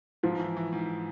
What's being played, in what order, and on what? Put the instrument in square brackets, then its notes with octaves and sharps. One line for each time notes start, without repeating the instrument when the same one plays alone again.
[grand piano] G#2 [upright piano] F3
[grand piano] E3
E3
G#2